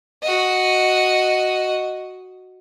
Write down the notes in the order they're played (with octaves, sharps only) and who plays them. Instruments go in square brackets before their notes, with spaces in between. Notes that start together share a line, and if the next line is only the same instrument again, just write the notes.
[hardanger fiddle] F#4 D#5